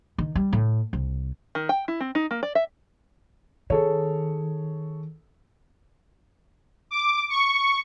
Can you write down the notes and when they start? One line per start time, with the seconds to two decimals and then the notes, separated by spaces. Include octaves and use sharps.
0.18 D#3
0.35 G3
0.53 A2
0.93 C2
1.55 D#3
1.69 G5
1.88 E4
2.00 C4
2.15 D#4
2.31 A#3
2.43 D5
2.55 E5
3.70 D#3 G#4 A4 C#5
6.91 D6
7.30 C#6